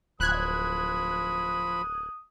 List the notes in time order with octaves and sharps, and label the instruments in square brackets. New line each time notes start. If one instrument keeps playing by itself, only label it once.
[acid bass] D1 [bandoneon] F3 B5 [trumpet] D#6 [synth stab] F#6 G#6